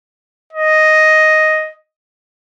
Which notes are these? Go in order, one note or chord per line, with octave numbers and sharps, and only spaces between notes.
D#5